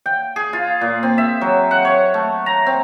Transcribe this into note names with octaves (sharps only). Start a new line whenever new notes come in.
G5
G#4
F4
A#2
C4
E5
F#3
F#5
C#5
A3
A#5
C4